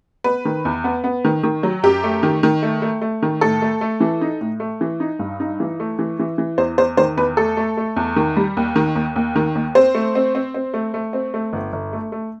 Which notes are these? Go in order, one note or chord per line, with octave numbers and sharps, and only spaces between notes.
B3 B4
D#3
E2
B3
B3
D#3
D#3
F#3
F#2 G4
A3
D#3
D#3
A3
A3
A3
D#3
A2 A4
A3
A3
E3
D#4
A2
A3
E3
D#4
G2
D#4
E3
A3
E3
E3
E3
E2 C5
E2 C5
D#3 C5
E2 B4
A3 A4
A3
A3
E2
D#3
G3
D#2
D#3
D#2
D#2
D#3
D#2
C4 C5
A3
C4
C4
C4
A3
A3
C4
A3
G1
G1
A3
A3